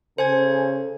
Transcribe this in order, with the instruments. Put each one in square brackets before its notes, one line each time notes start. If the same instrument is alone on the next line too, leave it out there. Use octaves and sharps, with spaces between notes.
[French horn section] C#3 A4 [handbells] C5 G#5 G#6